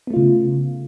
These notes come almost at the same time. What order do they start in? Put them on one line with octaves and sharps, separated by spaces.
B3 A3 F4 C#3